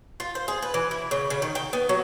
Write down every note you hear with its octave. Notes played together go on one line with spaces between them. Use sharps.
F4
C5
G#4
B4
E3
E4
C#3
C#3
D#3
G5
B3
F#3